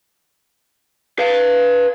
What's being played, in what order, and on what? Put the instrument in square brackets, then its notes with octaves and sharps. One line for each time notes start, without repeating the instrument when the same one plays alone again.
[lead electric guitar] B4 F5